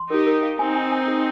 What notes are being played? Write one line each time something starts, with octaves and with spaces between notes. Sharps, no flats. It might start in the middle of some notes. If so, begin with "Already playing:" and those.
Already playing: C6
D#4 G4 A#4
A#4
F5
C4 D#4 G#5
G#5
G#5
G#4